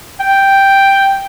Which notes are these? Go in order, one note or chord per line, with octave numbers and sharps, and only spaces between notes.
G5